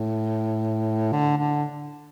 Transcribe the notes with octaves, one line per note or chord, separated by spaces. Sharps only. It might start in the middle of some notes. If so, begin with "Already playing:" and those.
Already playing: A2
D3
D3